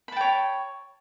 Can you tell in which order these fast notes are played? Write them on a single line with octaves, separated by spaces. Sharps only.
B5 A5 G5 C#5